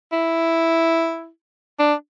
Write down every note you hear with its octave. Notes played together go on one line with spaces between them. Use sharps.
E4
D4